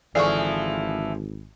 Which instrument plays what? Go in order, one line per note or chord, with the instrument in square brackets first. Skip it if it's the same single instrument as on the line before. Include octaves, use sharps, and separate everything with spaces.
[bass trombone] G#1 [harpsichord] D3 G#4 F5 [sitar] E3 F3 [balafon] D5 C#6